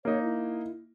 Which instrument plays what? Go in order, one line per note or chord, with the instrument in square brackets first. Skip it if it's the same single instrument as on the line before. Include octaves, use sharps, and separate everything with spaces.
[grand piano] A#3 D#4 [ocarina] C#5
[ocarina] E4